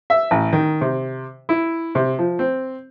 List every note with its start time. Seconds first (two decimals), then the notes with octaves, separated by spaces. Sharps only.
0.10 E5
0.31 A1
0.53 D#3
0.81 C3
1.49 E4
1.95 C3
2.19 F3
2.39 C4